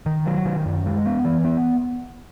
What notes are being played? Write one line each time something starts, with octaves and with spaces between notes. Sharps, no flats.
D#3
F#3
D#3
F#2
G#3
B3
E3
B3